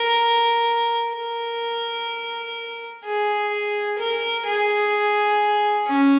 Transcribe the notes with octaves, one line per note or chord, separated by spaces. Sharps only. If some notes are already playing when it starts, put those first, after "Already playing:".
Already playing: A#4
A#4
G#4
A#4
G#4
C#4